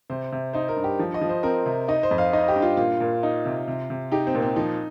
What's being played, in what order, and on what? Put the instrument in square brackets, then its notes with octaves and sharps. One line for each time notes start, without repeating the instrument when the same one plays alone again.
[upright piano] C3 [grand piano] C5
[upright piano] C3
[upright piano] D#4 [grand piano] C5
[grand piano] A#4
[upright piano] G2
[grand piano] G4
[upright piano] F3
[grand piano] D#5
[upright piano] F3
[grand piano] C5
[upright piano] C4 [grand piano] A#4
[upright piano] C3
[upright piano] D#4 [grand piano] D#5
[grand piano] C5
[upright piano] F2
[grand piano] F5
[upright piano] D#4 [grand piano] D#5
[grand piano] G4
[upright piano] G2
[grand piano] F4
[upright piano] A#2 [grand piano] F4
[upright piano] A#2
D#4
C3
C3
C3
[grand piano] D#4 [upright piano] G4
[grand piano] C4
[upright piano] A#2
[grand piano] C4
[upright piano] F3 [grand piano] D#4